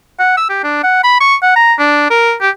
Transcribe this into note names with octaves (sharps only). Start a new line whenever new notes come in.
F#5
E6
G4
D4
F#5
B5
C#6
F#5
A#5
D4
A#4
G4